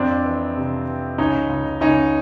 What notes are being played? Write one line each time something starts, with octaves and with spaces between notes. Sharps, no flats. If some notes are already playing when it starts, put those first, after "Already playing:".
Already playing: F2 C4 D4
E3
C3
E3
C#2 C#4 D#4
C#2
C#2 C#4 D#4